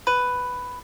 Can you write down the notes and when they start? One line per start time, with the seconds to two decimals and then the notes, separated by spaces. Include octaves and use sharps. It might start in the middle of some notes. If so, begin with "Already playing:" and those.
0.07 B4